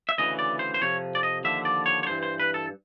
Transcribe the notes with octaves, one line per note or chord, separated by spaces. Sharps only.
E5
D2 C#3 E3 D#5
D5
C5
C5
F2 C3 F3 C#5
D5
D#5
D#2 D3 F3 E5
D5
C#5
C#5
G2 E3 C5
C5
B4
A4